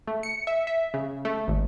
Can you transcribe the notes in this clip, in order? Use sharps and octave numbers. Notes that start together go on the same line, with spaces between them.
A3
C#7
E5
E5
C#3
A3
G#1